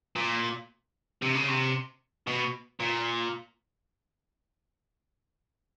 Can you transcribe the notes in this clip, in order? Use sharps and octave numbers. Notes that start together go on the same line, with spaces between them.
A#2
C3
C#3
C3
B2
A#2